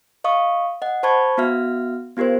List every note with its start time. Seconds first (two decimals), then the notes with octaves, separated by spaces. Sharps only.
0.24 D#5 F5 C#6 D#6
0.82 D#5 F#5
1.03 C5 A5 B5 C#6 G#6
1.37 B3 F#4 E5 F6
2.17 B3 F4 G4 A#4 C5